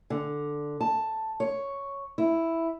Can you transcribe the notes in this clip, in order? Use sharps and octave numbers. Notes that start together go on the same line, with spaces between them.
D3
A5
C#5
E4